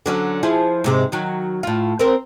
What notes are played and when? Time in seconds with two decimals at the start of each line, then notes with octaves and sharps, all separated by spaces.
0.06 D3 F#3 C#4
0.43 F3 E4 G#4
0.84 G#2 C3 G#3
1.12 D#3 F#3
1.63 A2 F4
1.99 C4 A#4